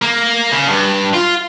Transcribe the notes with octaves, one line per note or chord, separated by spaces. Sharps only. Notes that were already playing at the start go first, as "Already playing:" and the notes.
A#3
C#3
G2
F4